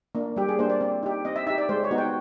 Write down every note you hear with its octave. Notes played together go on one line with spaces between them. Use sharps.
A#3 D4
G3 G4
G#4
A#3 D4 C5
D5
C4
D#4 G4
C4 D#5
E5
D#4 G4 E5
D5
G#3 C5
C#5
B3 D#4 F#4
G5